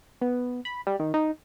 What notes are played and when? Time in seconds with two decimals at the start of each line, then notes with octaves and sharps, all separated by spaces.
0.21 B3
0.65 B5
0.87 G3
0.99 D#3
1.14 D#4